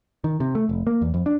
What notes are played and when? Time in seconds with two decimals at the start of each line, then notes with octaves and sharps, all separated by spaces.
0.24 D#3
0.40 C3
0.55 A3
0.69 F1
0.87 A#3
1.02 E2
1.14 F2
1.26 D4